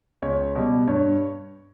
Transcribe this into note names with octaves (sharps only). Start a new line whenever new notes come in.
C#2 C#5
B2 G3
G2 C#5